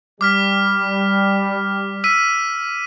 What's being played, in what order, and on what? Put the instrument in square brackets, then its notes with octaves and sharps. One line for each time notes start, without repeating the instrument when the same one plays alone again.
[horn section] G3 [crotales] D6 F6 B6
[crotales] E6 B6 D#7